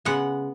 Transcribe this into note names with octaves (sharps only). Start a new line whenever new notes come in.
C#3 G#3 B3 F#5